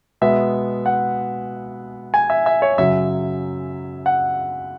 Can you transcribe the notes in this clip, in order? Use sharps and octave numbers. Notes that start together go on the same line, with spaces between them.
B2 G#3 B3 E5
F#5
G#5
E5
E5
C#5
F#2 C#3 F#3 E5
F#5